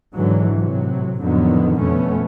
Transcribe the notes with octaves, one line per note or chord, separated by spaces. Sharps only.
G#2 D3 E3 F#3
A2 C3 F#3
F2 A2 D3 D#3 F#3 B3
F2 B2 A3 B3 C#4